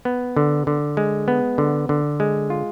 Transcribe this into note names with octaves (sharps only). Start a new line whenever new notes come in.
B3
D3
D3
G#3
B3
D3
D3
G#3
F4